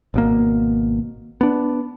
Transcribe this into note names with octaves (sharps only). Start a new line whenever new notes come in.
G#1 B2 A#3
B3 D4